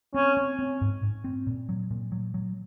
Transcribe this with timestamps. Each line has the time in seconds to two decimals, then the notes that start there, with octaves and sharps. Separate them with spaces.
0.14 C4 C#4
0.37 C4
0.59 C4
0.81 G#2
1.03 G#2
1.24 C4
1.47 A#2
1.69 F#3
1.91 A#2
2.12 F#3
2.34 F#3